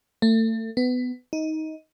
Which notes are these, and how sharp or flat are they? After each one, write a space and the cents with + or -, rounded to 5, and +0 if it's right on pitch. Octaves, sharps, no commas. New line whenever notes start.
A3 +30
B3 +20
D#4 +15